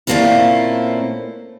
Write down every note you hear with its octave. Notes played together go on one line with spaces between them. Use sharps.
A#2 A3 A#3 C4 C#4 E4